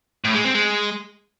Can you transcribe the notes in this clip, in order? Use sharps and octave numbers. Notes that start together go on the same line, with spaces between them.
A2
G#3
C4
G#3